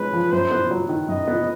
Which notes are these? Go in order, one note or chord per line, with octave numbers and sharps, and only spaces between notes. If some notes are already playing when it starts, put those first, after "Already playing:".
Already playing: G#3 C#4 B4
F3
F#2 C5
B3
F#3
D#3
F#2 D#5
B3